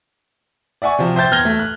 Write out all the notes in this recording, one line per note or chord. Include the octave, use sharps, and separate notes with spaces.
D5 E5 F#5 G#5 C#6
C3 F3
C5 E5 G5 G6 A6
E2 F6 G#6 A#6 G7
A3
F#6